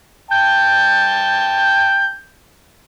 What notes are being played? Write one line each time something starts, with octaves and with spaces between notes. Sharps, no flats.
G5 A5 G6